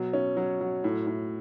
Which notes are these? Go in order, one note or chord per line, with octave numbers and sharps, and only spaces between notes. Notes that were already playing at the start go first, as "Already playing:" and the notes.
Already playing: B2 F#3
C#4
F#3
F#3
A2
A2